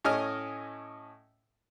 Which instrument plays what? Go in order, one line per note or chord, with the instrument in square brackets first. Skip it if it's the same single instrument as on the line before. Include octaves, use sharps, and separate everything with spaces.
[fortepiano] A2 C#4 D#5 G#5 D#6 F6